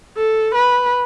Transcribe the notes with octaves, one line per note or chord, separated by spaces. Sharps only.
A4
B4